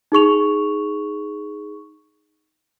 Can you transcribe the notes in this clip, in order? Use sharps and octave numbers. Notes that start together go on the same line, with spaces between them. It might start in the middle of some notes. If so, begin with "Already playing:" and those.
D#4 G#4 C#6 F7